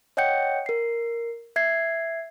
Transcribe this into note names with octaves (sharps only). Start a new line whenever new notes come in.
C#5 D#5 F#5 G5 G6 C#7
A#4 C7
E5 G#6 C7